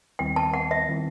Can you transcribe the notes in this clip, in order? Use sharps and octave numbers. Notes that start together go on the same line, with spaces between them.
D#2 D#3 G3 C4 E4 G5
A5
F#5
E5
D#3 G3 C4 E4